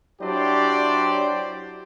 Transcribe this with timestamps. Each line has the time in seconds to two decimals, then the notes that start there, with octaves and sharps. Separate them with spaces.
0.22 F#3 D4 E4 G4 C5 D5